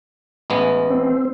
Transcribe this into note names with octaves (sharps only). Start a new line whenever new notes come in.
A1 G#3 B3
C4